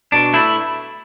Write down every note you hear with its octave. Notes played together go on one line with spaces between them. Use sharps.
B2 D4
A3 E4